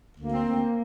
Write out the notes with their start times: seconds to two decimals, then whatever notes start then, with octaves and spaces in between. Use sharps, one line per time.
0.18 D2 A#3
0.33 C4
0.48 D2